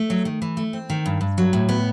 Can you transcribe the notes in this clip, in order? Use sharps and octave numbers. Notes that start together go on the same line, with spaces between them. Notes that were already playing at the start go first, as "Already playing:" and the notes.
Already playing: A3
F#3
D#3
E3
A3
C4
D#3
G2
G2
F#3
A2
B3